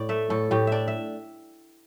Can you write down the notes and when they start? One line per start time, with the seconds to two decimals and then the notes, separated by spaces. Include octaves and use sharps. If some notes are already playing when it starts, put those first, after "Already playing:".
Already playing: A2 D5
0.09 A3 E5
0.30 A2 A4
0.51 A2 G4
0.67 D4 D5 E5
0.88 E5